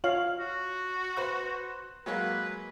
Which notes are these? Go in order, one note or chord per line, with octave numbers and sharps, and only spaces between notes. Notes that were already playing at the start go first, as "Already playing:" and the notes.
F4 C#5 F5 F#7
F#4
B4 C5 F#6
F#3 G#3 A#3 B4